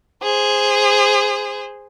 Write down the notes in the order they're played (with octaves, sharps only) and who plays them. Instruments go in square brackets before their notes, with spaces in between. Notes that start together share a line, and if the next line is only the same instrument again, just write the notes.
[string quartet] G#4 C5